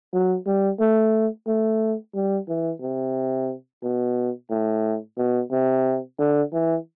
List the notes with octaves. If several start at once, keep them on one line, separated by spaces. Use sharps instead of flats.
F#3
G3
A3
A3
G3
E3
C3
B2
A2
B2
C3
D3
E3